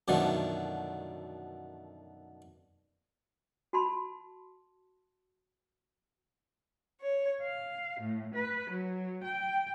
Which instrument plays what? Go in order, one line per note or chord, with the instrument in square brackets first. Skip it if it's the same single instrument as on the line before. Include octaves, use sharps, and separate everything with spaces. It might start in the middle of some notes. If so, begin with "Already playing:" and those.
[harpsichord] F#2 B2 D3 D#3 F3 A3
[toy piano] F#4 A5 B5 C6
[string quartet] C#5
F5
A2
B4
F#3
G5